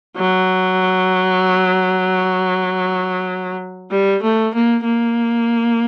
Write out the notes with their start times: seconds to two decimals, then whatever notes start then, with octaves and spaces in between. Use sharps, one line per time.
0.17 F#3
3.91 G3
4.23 A3
4.54 A#3
4.84 A#3